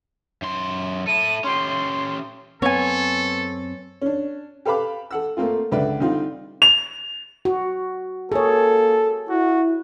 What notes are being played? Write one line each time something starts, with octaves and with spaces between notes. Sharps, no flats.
F#2 C6
E4 A4 D#7
C#4 G4 C6
F#2 B3 C4 A4 C#5 G#5
C#4 D4
G4 A4 B4 F5 B5 D6
A4 F#5 E6
A3 A#3 C4 F4
C#2 D3 B4 D5 E5
D3 G3 C4 D#4 F4
F7
F#4
A#3 G#4 A4 C#5
E4 F#4